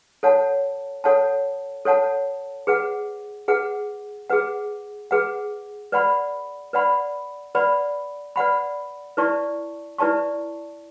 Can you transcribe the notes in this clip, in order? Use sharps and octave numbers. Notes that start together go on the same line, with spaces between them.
A4 C#5 F#5 A5
A4 C#5 F#5 A5
A4 C#5 F#5 A5
G#4 B4 F#5
G#4 B4 F#5
G#4 B4 F#5
G#4 B4 F#5
B4 D5 F#5 B5
B4 D5 F#5 B5
B4 D5 F#5 B5
B4 D5 F#5 B5
E4 B4 D5 A5 C#6
E4 B4 D5 A5 C#6